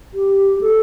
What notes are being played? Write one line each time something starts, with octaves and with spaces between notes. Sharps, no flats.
G4
A4